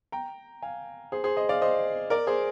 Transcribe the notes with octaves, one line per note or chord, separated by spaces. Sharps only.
G5 A#5
F5 G#5
G#4 C5
G#4 C5
C5 D#5
D5 F5
C5 D#5
A#4 D5
G#4 C5